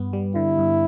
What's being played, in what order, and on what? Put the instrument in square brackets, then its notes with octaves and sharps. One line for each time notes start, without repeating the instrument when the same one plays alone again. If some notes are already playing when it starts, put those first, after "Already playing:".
Already playing: [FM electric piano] G2 B3
G3
[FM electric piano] D3 [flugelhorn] E4
[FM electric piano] G2